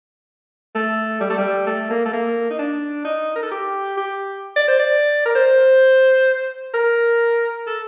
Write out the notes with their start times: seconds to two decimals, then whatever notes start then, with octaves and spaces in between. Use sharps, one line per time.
0.75 A3
1.21 G3
1.30 A3
1.38 G3
1.67 A3
1.90 A#3
2.05 A3
2.13 A#3
2.50 D#4
2.59 D4
3.05 D#4
3.36 A#4
3.43 A4
3.52 G4
3.98 G4
4.56 D5
4.68 C5
4.80 D5
5.26 A#4
5.35 C5
6.74 A#4
7.67 A4